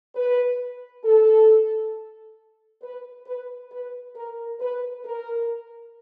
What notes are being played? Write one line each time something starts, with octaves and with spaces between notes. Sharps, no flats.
B4
A4
B4
B4
B4
A#4
B4
A#4